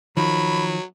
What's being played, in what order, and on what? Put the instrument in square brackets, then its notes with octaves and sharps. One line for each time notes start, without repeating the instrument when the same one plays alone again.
[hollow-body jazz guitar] D#3 F3 [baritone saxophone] F#3 [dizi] B5